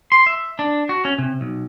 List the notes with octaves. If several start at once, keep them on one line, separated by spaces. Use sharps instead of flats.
C6
E5
D4
F#4
C#4
C3
B1